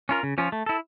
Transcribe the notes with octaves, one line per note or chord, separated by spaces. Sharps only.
C#4 F4 A#4
C#3
F3 C#4 F4
A3
E4 A4